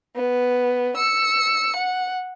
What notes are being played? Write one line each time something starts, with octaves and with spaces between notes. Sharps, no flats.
B3
E6 C#7
F#5